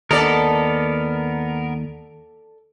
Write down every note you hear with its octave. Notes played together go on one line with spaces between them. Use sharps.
D#2 B3 A4 A#4 D5 D#5